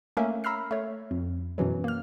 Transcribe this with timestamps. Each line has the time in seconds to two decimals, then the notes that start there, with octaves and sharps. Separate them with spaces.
0.17 A3 A#3 C#4 A#4 E5
0.44 A#5 B5 E6 F6 C7
0.71 A3 C#5
1.11 F2
1.58 F#2 B2 E3 F#3
1.84 A#3 F6